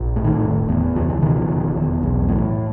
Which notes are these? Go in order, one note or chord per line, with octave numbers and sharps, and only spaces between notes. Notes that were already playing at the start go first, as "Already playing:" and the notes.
Already playing: A#1
A2
D#3
F1
E2
C#2 F3
E3
B2 D#3 F3
F1
E2
B1
A2